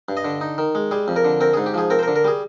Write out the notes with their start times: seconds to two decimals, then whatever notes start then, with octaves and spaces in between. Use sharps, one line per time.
0.09 G2
0.17 D#5
0.25 D3
0.41 D#4
0.58 D#3
0.75 G#3
0.91 G3 G#4
1.08 F2
1.16 A#4
1.25 D3
1.40 C4 A#4
1.54 G#2 G#4
1.66 G4
1.74 F3 G#4
1.90 C4 A#4
1.99 C5
2.03 A#4
2.08 D3
2.16 A#4
2.24 G3 G#4